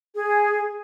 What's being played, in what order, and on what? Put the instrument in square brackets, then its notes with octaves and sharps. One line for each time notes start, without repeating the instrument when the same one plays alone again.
[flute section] G#4